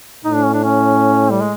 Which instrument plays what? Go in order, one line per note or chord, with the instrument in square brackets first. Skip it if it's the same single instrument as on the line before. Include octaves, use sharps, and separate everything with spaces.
[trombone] A2 [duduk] D#4
[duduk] D4
C#4
D4
C#4
G3
G#3